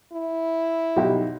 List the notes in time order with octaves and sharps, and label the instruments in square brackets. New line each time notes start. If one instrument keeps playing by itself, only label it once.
[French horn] E4
[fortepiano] B1 D#4 G4